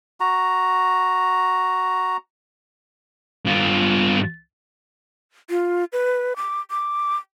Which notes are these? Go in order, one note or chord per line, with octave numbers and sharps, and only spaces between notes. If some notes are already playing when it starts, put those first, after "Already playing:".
F#4 A#5
G2 F4
F4
B4
D6
D6